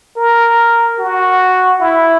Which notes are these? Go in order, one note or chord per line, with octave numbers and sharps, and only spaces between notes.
A#4
F#4
E4